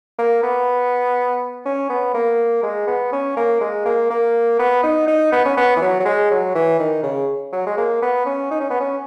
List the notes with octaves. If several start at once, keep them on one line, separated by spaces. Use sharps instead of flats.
A#3
B3
C#4
B3
A#3
G#3
B3
C#4
A#3
G#3
A#3
A#3
B3
D#4
D#4
B3
C#4
B3
E3
F#3
F#3
G#3
F#3
E3
D#3
C#3
F#3
G#3
A#3
B3
C#4
D#4
C#4
B3
C#4